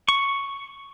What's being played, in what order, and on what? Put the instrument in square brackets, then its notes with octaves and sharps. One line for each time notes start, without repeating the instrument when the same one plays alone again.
[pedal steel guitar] C#6